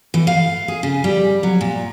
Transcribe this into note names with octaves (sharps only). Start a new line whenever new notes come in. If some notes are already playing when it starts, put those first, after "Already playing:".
E3
F5
G#4
C#3
G3
F#3
A#2